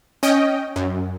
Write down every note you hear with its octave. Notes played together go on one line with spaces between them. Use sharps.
C#4 D#5 G5
F#2